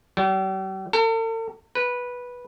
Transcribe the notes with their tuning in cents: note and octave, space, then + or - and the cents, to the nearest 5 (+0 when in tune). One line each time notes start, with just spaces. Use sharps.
G3 -45
A4 +45
B4 -10